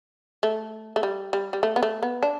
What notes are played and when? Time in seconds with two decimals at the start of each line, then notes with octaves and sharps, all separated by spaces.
0.43 A3
0.96 A3
1.03 G3
1.33 G3
1.53 G3
1.63 A3
1.76 B3
1.83 A3
2.03 B3
2.23 D4